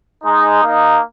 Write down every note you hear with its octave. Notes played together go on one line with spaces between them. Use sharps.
G#3 D#4
A#3 D#4